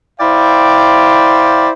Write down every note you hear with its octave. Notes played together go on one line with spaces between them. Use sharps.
E4 C5 D5 F5 G5